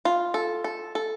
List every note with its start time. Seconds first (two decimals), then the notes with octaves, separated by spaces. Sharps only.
0.05 F4
0.34 A4
0.64 A4
0.95 A4